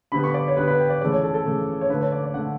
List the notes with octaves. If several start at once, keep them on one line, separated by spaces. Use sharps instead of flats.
D3 G3 B3 B5
C#6
D5
C#5
D3 G3 B3 B4
B4
G5
D5
C#3 E3 A3 D5
C#5
A4
A4
C#3 E3 A3
C#5
D3 A3 B4
C#5
D5
D5
D3 A3 F#5